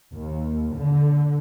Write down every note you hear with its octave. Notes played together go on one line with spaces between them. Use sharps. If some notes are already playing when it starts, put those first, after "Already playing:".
D#2
D3